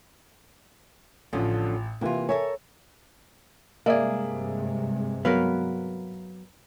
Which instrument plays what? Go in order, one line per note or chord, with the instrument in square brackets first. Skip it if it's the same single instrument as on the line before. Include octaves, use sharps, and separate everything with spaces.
[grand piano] A1 [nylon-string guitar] D3 F3 C#4
[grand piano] C3 E3 [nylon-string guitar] A#3 F4
[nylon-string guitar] A4 A#4 C#5 [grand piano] E5 G#5
[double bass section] G2 C3 G#3 [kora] A#3 G#4 [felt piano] D5 E5
[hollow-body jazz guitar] F#3 B3 [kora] A#4 B4 F5